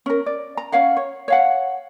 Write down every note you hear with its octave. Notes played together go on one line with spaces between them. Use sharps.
C#4 A#4
D5
A#5
C#4 C#5 F5 F#5
C#5
C#5 F5 F#5